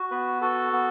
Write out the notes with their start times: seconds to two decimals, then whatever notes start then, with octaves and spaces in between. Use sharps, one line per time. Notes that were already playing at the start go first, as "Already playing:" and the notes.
Already playing: F#4
0.11 B3 B4
0.41 F#4 A4
0.73 B3